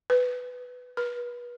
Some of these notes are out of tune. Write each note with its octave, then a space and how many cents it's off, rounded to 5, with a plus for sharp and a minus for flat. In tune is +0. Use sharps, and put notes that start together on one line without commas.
B4 +10
B4 -30